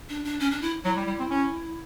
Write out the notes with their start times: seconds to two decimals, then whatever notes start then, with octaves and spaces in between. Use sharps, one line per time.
0.09 D4
0.24 D4
0.40 C#4
0.51 D4
0.62 E4
0.84 F#3 E4
0.97 G3
1.07 G3
1.19 C4
1.30 C#4